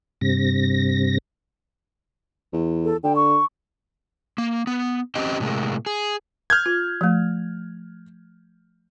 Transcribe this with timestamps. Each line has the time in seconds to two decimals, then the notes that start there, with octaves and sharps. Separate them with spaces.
0.21 G2 C3 A#6
2.53 E2
2.85 A4
3.04 D3 G5
3.16 C#6
4.38 A#3
4.67 B3
5.15 C4 C#4 G4 C5 D#5
5.40 A2 C3 F#3 G#3 A#3
5.86 G#4
6.50 F6 G6 G#6
6.66 F4
7.01 F3 A3